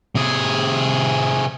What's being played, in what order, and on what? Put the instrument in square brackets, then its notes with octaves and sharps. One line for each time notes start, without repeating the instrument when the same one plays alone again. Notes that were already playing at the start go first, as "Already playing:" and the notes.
[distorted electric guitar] C3 G#4